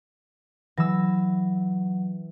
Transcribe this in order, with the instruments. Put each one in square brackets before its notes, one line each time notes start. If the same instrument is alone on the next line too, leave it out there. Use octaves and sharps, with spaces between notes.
[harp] E3 E6 [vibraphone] F#3